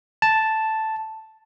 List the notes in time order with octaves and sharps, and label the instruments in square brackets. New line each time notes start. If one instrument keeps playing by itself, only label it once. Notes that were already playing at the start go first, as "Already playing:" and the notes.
[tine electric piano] A5